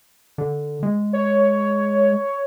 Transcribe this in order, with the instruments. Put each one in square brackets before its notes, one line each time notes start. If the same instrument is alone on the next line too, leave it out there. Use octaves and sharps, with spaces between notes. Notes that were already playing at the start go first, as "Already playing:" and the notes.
[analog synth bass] D3
G#3
[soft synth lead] C#5